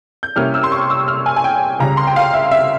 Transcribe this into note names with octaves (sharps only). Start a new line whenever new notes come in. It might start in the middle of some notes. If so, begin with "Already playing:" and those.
G6
C3 G3 A#3 C#4 E4 F6
E6
C6
C#6
E6
F6
G#5
G#5
G5
C#2 C#3 G3 A#5
C6
G5
F5
E5
E5